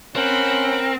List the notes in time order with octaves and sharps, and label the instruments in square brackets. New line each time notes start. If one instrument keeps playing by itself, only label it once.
[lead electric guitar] C4 [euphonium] C#4 [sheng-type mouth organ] A#4 [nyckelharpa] F#5 B5